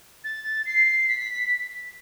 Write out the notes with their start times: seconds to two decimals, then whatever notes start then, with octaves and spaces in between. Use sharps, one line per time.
0.24 A6
0.66 C7
1.08 B6